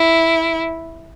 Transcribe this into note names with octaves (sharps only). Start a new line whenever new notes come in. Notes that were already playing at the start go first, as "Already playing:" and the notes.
Already playing: E4